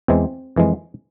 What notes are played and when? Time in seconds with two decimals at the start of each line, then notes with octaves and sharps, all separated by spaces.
0.08 E2 E3 G#3 C4
0.56 F2 E3 G#3